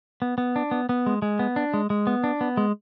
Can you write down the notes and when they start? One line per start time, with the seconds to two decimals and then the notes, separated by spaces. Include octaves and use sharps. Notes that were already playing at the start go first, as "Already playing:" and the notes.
0.22 B3
0.38 B3
0.56 D4
0.71 B3
0.89 B3
1.06 G#3
1.22 G#3
1.39 B3
1.56 D4
1.74 G#3
1.90 G#3
2.07 B3
2.24 D4
2.41 B3
2.57 G#3